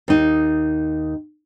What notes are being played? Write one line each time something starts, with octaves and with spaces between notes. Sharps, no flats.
D#2 D#4